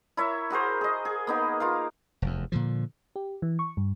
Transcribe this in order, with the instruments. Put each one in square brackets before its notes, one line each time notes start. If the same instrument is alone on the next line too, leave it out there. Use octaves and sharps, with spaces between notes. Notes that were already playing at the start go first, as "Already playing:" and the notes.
[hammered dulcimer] E4 A#4 C#5 E5
F#4 G#4 A#4 C5
G#4 D#5
G#4
A#3 B3 D#4
F4 A#4 F5
[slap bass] F1 E2
A#2 D3 F3
[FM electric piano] G4
E3
C#6
G2